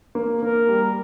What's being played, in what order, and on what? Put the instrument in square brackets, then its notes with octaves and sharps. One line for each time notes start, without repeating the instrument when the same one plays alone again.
[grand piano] A#3
[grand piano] A#3 [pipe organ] A#4
[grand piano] G3